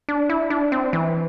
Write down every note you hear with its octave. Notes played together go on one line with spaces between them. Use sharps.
D4
E4
D4
C4
E3